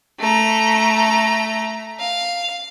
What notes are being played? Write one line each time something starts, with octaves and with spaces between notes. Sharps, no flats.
A3 A#5
F5